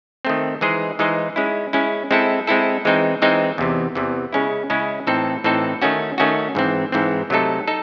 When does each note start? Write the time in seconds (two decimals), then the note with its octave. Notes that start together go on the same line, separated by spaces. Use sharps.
0.25 D#3 A3 C4
0.61 E3 G#3 D#4 G#4 C5
0.99 E3 G#3 D#4 G#4 C5
1.36 G#3 C#4 E4
1.73 G#3 C#4 E4
2.11 G#3 C4 E4 A4
2.47 G#3 C4 E4 A4
2.85 E3 G#3 C4 D#4
3.22 E3 G#3 C4 D#4
3.58 E2 C3 E3
3.95 E2 C3 E3
4.33 C#3 G#3 C#4 E4
4.70 C#3 G#3 C#4 E4
5.07 A2 E3 C4 D#4 A4
5.44 A2 E3 C4 D#4 A4
5.82 D#3 A3 C#4 F#4
6.18 D#3 A3 C#4 F#4
6.55 G#2 E3 C4
6.92 G#2 E3 C4
7.30 C3 F#3 A3 D#4 A4
7.68 D#4 A4